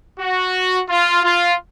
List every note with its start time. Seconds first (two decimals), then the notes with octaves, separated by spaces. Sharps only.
0.20 F#4
0.89 F4
1.24 F4